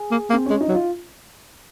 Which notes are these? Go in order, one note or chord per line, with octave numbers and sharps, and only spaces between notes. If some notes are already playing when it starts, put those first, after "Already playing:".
Already playing: G#4
A#3
A#3
C4
G#3 C#4
D#4
F#3
F4